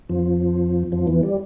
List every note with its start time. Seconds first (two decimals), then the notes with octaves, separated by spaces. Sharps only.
0.09 F2 F3
0.92 F2 F3
1.07 E2 E3
1.23 G3